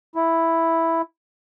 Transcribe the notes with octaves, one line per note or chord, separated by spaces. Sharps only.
E4